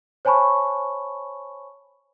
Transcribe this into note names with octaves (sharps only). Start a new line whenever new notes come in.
C5 C#5 G#5 A5 B5 C#6